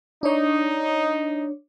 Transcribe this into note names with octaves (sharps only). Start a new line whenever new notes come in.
D4 D#4 C#5